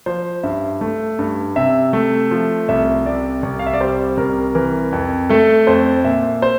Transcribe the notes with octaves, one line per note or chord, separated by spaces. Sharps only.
F3 C5
G2 E5
A3
G2
C3 E5
A3
F3
C2 E5
C3 D5
C2
F5
E5
D5
G3 C5
C2 A#4
E3 A#4
F2
A3 A4
F2 C5
A#2 E5
C5